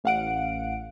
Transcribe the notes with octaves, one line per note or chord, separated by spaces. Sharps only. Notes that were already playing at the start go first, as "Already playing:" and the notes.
A1 F5 F#5 D7